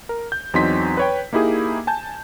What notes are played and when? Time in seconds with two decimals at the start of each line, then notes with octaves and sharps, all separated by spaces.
0.09 A#4
0.32 G6
0.54 E2 F#3 C4 D#4 C6 B6
0.97 B4 C#5 G5
1.33 A#3 D#4 E4 G4 G#4
1.87 G#5 A5 G6